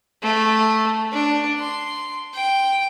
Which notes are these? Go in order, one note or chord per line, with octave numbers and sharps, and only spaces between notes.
A3
D4
C6
G5